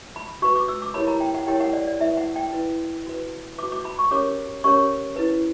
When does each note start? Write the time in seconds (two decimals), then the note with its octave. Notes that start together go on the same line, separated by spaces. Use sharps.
0.16 B5
0.42 F#4 B4 C#6
0.56 D6
0.68 E6
0.82 D6
0.94 E4 G4 A#4 C#5 B5
1.08 A#5
1.20 G5
1.34 F#5
1.47 E4 G4 A#4 C#5 G5
1.60 F#5
1.73 D5
1.87 D5
2.00 E4 B4 E5
2.17 F#5
2.36 G5
2.53 E4 B4
3.06 F#4 B4
3.58 B4 D6
3.63 F#4
3.72 D6
3.85 B5
3.99 C#6
4.11 C#4 G4 A#4 C#5 D6
4.64 C#4 G4 A#4 C#5 C#6
5.16 E4 B4